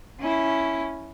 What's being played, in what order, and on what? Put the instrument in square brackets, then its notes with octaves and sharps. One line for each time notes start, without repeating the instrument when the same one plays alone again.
[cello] C#4 E4